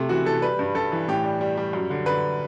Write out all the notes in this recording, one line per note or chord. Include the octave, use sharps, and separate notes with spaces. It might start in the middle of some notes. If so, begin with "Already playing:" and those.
Already playing: C3 A3
E3 F#4
E3 A4
G3 B4
G2
G2 A4
E3
A2 G4
G3
G3
G3
F#2
D3
D3 B4